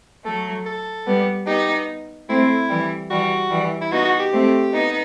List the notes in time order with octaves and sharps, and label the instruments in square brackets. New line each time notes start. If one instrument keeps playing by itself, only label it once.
[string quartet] F#3 A3 [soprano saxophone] A4
[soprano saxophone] A4
[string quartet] G3 B3
[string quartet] B3 D#4 [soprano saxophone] G4
[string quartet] A3 C4 [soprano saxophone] E4
[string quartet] E3 G3
[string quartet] E3 G3 [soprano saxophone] F#4
[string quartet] E3 G3
[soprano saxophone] E4
[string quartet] B3 D#4 [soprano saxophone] F#4
[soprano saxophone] F#4
G4
[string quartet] A3 C4
B3 D#4